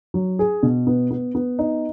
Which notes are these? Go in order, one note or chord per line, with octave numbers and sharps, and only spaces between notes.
F#3
G#4
B2
B3
B3
B3
D#4